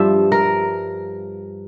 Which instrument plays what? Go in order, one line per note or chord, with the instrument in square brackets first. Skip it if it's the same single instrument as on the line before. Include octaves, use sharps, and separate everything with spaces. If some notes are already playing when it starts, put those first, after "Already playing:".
Already playing: [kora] G2 F3 E5
A#4